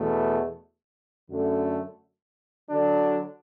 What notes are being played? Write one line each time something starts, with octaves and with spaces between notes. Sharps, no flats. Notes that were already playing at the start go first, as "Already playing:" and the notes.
Already playing: E2 B2 A3
F#2 D3 A3
D3 F#3 D4